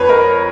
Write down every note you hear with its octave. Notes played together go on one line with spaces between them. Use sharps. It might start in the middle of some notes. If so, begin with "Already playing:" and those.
Already playing: F2 F3 B4 C#5
A#4